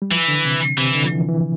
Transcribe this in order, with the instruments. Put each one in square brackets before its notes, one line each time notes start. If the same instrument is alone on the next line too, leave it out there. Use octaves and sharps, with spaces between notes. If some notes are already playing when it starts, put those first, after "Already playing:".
[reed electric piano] G3
[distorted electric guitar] E3 [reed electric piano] F3
[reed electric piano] D3
C3
[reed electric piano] C3 [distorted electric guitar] E3
[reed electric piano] D3
F3
E3
E3